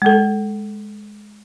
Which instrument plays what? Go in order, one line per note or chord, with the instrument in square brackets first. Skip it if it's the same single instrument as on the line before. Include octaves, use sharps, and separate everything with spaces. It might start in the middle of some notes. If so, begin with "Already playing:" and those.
[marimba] G#3 A4